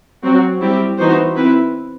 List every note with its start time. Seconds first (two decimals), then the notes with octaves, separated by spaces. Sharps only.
0.23 F#3 C4 F#4
0.61 G3 C4 E4 G4
0.98 E3 B3 D#4 F#4 C5
1.35 C4 E4 B4